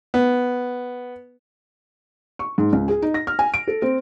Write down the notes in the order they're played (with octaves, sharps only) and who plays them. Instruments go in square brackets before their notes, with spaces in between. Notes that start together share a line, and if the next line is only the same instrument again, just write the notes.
[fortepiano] B3
[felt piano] C#6
G#2
C#2
G#4
D#4
A#6
F6
G#5
D7
A4
C4